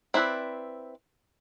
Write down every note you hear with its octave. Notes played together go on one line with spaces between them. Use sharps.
C4 E4 B4 D5